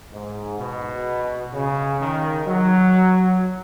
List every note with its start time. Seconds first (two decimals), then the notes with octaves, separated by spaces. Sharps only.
0.13 G#2
0.59 B2
1.53 C#3
2.00 D#3
2.46 F#3